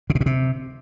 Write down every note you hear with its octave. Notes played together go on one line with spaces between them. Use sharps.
C#3
B2
A#2
C3